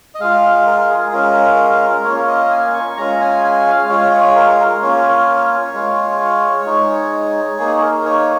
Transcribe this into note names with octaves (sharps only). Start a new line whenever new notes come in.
D#5
G#3 F4 F5
A#4
G#4
G#3 C#4 F4 A#4
A#3 C#4 F4 C#5
D#5
G#5
C#6
G#3 C#4 F4 A#5
G#5
G#5
F5
G#3 F4 C#5
C#5
A#4
A#4
A#3 C#4 F4 C#5
G#3 F4
G#3 D#4
A#3 D#4 G#4
A#4
C#5